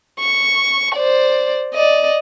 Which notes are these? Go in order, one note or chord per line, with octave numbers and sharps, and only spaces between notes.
C#6
C5 D5
D5 D#5